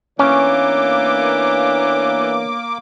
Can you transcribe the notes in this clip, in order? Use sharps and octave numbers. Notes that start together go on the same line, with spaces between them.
E3 A#3 B3 C#4 D4 C#5 D6